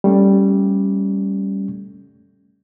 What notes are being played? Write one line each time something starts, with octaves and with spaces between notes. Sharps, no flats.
G3 A3 C#4